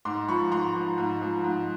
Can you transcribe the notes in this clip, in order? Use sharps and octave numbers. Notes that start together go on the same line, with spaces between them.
G#2 C6 D6
F3 B5 C#6
G#2 A#5 C6
F3
G#2
F3
G#2